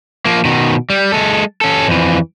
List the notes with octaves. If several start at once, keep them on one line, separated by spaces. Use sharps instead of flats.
F3 A#3
B2 D#3
G3
G#3 A4
C#4 A4
F2 E3